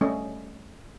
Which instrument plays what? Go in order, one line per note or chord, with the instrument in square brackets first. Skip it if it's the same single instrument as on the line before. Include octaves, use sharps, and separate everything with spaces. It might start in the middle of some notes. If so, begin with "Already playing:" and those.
[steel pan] G3 A3 C#4 D#5